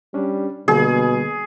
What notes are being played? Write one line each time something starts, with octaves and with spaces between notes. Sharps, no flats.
G3 C#4 D4
B2 D3 G3 A#3 G#4